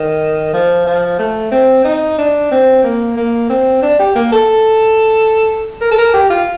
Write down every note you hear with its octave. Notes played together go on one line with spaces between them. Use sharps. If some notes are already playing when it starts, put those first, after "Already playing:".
Already playing: D#3
F3
F3
A3
C4
D#4
D4
C4
A#3
A#3
C4
D4
G4
A#3
A4
A#4
A4
A#4
G4
F4